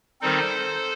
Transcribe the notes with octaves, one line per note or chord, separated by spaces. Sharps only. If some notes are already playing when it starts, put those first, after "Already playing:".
D#3 G3 C4 D#4 A4 C5